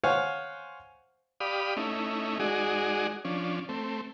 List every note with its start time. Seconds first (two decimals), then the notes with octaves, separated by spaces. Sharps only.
0.04 C5 C#5 F5 F#5 G#5
1.40 G4 D5 F5 B5 D#6
1.77 A3 C#4 D#4 E4
2.40 G#3 D#4 F#4 G#4 D5
3.25 F3 C#4 D4
3.69 A3 C4